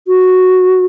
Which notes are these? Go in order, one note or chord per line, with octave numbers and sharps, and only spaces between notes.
F#4